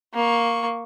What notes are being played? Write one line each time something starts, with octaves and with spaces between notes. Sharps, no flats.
A#3 C#6